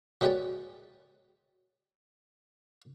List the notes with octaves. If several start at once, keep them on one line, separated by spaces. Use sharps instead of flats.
F#3 G#3 G4 B4 C#5 D5